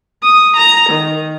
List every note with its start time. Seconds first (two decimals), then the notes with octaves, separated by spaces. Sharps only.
0.22 D#6
0.56 A#5
0.90 D#3